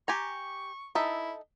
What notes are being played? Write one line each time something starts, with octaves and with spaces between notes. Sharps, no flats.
G4 G#5 A#5 C#6
D#4 E4 A4 E5